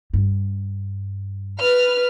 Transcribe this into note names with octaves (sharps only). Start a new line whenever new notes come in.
G2
B4 F6